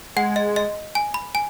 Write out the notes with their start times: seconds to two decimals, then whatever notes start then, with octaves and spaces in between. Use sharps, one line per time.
0.16 G#3 F#5
0.36 D#5
0.56 D#5
0.95 G#5
1.14 B5
1.35 G#5